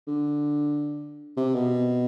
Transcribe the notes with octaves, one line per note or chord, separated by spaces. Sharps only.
D3
C3
B2